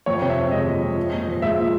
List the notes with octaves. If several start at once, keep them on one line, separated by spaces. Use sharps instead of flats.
F2 C#5
C3
E5
C3
G#3 D#5
F2
F2
F3
A#2
F3
G#3 E5
A#2